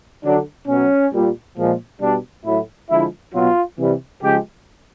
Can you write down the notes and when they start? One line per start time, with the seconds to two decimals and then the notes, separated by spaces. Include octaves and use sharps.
0.24 D3 F#3 D4
0.68 B2 F#3 C#4
1.13 A#2 G3
1.57 A#2 F3 G#3
2.01 B2 G3 D4
2.45 A2 F#3 E4
2.90 D3 F3 G#3 E4
3.34 B2 F#3 F4
3.78 C3 E3 G3
4.22 C#3 F3 G#3 G4